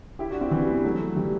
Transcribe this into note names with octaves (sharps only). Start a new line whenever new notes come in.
E4 G4
D4 F#4
C4 E4
E3 G3
B3
F#3 A3
E3 G3